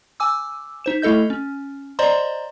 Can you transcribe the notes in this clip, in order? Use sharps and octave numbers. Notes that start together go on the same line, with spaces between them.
G#5 D6 E6
D#4 C5 E7
A3 E4 A4 D#5 G6
C#4
C5 D5 D#5 A#5 C6